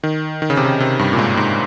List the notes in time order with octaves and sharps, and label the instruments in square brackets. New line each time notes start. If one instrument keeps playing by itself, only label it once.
[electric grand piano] D#3
D#3
C#3
C3
C#3
C3
G2
A#2
G#2
G#2